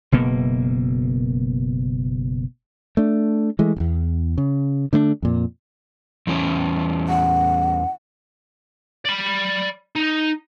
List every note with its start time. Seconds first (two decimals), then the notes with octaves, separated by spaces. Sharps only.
0.12 F#1 B2 A#3
2.97 A3 D4
3.59 E3 G#3 A3
3.76 D1 E2
4.38 C#3
4.93 D3 A3 B3 D4
5.22 F2 A#2
6.27 E2 E3 C#4
7.09 F#5
9.05 D5 B5
9.96 D#4